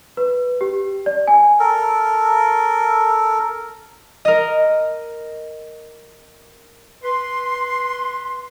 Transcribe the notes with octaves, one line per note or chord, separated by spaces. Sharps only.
B4
G4
D5
G#5
A4 A#4
A#4 D#5
B4 C6